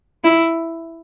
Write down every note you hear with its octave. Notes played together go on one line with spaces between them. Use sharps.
E4